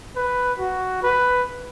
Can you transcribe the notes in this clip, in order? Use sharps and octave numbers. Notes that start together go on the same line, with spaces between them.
B4
F#4
B4